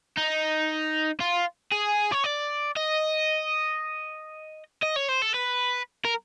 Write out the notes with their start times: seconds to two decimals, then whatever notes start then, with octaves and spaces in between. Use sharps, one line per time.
0.17 D#4
1.20 F4
1.72 G#4
2.12 C#5
2.24 D5
2.77 D#5
4.82 D#5
4.96 C#5
5.09 C5
5.22 A4
5.34 B4
6.05 A#4